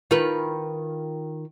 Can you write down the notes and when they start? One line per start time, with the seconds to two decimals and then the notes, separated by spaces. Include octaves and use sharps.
0.11 D#3 F4 B4